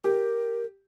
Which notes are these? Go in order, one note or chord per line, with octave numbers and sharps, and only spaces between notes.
G4 A#4